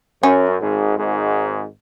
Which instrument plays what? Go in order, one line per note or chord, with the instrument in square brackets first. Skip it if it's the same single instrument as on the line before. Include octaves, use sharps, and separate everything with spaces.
[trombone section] F#2 [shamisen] C#4
[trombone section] G#1 G#2
G#1 G#2